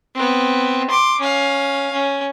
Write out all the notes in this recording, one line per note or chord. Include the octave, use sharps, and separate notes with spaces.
B3 C4
C6 D6
C#4 F5
C#4